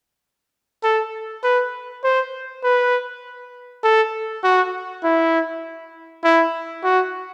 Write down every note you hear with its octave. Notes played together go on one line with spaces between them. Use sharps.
A4
B4
C5
B4
A4
F#4
E4
E4
F#4